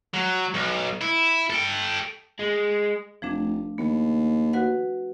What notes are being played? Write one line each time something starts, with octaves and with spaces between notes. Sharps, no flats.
F#3
B1
E4
A4 G5
G#3
F1 F3 A3 D4
D#2 B3
F#4 B4 F#5